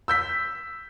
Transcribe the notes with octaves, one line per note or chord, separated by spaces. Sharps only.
E6 G6 B6